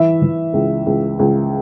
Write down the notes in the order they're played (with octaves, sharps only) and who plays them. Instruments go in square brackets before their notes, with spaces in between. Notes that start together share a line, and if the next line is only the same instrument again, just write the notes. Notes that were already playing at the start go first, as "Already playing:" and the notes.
Already playing: [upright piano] E3 E5
E3
C#2
C#2
C#2